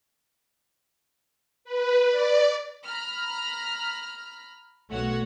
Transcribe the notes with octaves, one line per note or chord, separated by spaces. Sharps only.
B4
D5
A#5 B5 F6
B1 A3 F#4 C#5 F#5